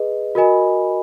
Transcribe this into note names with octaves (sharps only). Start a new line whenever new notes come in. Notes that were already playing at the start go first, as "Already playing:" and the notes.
Already playing: G#4 B4 D#5
F#4 A#4 D#5 G#5 B5